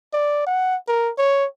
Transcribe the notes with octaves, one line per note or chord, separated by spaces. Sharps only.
D5
F#5
A#4
C#5